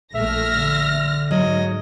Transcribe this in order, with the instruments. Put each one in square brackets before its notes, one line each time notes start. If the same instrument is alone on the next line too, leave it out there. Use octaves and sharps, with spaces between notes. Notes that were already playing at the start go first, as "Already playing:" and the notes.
[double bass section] A#1 A3 [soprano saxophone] E5 [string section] F6 A#6
[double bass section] D3
[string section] G#2 [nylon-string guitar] F#3 [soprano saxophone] D#5